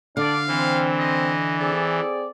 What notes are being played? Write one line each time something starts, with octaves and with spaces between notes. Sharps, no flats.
D3 D4 D5 F5
E3 C4
D#5
C4 G#4 A4 D5